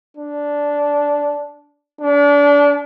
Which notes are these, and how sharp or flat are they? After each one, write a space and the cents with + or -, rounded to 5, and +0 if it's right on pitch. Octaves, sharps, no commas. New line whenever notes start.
D4 -10
D4 -30